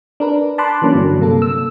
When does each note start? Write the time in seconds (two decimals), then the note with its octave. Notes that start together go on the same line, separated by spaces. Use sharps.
0.20 D4 A#4 B4
0.58 A5 B5 C6 D6 F#6
0.82 E3 F#3 A#3 C#4 D4
0.95 G2 D3 F#3
1.20 C3 A#3 A4
1.42 E6